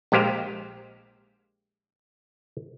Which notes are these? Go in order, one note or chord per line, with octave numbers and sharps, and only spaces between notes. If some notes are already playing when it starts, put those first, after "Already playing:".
A#1 G#3 G4 C5 F5